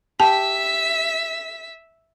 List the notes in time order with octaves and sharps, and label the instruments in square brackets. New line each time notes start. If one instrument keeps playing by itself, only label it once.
[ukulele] G4 [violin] E5 B6 [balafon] A5